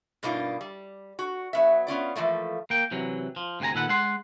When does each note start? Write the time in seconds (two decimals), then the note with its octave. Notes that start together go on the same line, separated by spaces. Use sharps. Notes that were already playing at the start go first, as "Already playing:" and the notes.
0.23 G2 B2 A#3 D4 D#4 F4
0.61 G3
1.19 F#4
1.53 F#3 B3 E5
1.87 B3 C#4 F4 D5
2.16 E3 F3 A3 A#3
2.70 A#3 G5
2.91 C3 E3 F#3
3.36 F3
3.60 D2 C3 F#4 G#5 A#5
3.75 A#2 D#3 A4 B4 F#5
3.89 G#3 F#5 C6